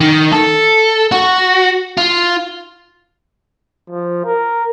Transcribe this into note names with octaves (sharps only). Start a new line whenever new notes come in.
D#3
A4
F#4
F4
F3
A#4